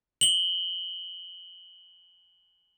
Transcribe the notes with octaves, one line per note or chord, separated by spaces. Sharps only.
F#7 G7